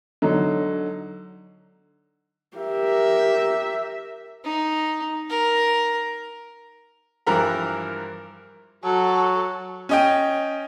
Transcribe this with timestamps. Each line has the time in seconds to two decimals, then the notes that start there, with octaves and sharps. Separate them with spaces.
0.22 D3 F#3 D#4
2.57 G4 A#4 E5
4.44 D#4
5.30 A#4
7.27 G2 E3 F3 A#4 A#5 B5
8.84 F#3 F#4 A4
9.89 C#4 D#5 G5